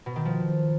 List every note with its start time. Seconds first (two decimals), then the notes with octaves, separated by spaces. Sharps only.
0.06 B2
0.16 D#3
0.25 F3